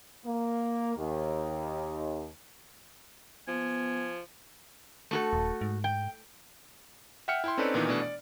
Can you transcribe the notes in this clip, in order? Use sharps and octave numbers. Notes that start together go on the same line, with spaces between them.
A#3
D#2
F3 B3 G#5
A3 F#4 A4
D#1
G#2
G5
E5 F#5 G5 F6 C#7
E4 G5 C6
C4 C#4 D#4 A4 B4 D5
A#2 D#3 E3 B3 D4 D#4
B2 E3 A3 D4
D5